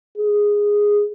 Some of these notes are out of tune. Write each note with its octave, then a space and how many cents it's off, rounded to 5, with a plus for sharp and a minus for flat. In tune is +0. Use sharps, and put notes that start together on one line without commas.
G#4 -5